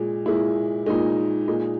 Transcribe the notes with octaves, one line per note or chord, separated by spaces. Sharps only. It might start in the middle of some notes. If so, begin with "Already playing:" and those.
Already playing: A#2 G#3
A#2 G#3 E4
A#2 G#3 D#4
A#2 G#3 D#4